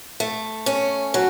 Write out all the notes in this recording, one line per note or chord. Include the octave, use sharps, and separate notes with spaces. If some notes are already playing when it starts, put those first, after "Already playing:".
A3
C#4
F#3